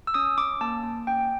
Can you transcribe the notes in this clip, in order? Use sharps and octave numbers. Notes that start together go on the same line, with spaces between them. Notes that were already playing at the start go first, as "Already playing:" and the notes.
E6
C#4 D#6
C#4 D6
A#3 A5
A#3
C#4 G5